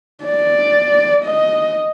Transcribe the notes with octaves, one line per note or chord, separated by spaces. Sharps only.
D5
D#5